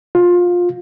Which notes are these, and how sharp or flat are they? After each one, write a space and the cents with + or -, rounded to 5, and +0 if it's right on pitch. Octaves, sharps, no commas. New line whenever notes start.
F4 +20